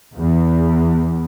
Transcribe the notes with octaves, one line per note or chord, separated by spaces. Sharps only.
E2